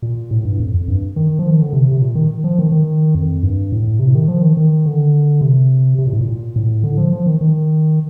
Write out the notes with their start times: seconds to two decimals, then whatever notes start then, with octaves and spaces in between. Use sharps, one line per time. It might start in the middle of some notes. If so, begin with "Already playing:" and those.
0.02 A#2
0.31 A2
0.45 G2
0.60 F2
0.74 F2
0.88 G2
1.16 D#3
1.39 F3
1.50 D#3
1.62 D3
1.73 C3
1.91 C3
2.02 A#2
2.15 D#3
2.44 F3
2.59 D#3
2.72 D#3
3.15 F2
3.43 G2
3.72 A2
4.00 C3
4.15 D#3
4.28 F3
4.42 D#3
4.57 D#3
4.86 D3
5.41 C3
5.98 C3
6.07 A#2
6.13 A2
6.21 A#2
6.56 A2
6.84 D3
6.97 F3
7.13 F3
7.26 D#3
7.41 D#3